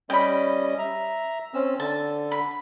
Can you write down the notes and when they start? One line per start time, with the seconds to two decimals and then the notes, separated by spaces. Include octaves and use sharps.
0.10 G3 C#4 D#5 G5 B5
0.78 E5 A#5
1.54 C4 C#4 E6
1.80 D3 A5
2.31 B5